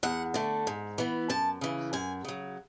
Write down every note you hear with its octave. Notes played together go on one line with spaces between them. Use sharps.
E2 F#5
D3 A3
G#2
E3 B3
F#2 A5
C#3 E3
F#2 G#5
C#3 F#3